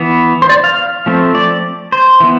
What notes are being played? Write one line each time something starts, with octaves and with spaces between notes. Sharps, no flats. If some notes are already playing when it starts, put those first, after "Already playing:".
Already playing: E3 B3
C5
D5
F5
F3 A3 C4
D5
C5
E3 B3